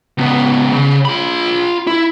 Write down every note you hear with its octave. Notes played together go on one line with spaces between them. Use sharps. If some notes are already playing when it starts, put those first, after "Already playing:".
C#2 B3
C#3
F4 B5
E4